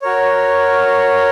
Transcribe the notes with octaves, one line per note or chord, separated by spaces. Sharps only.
F#4 A#4 C#5